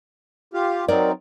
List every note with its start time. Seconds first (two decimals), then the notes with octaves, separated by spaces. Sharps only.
0.54 F4 G4 F5
0.88 F#3 C4 D#4 A#4 D5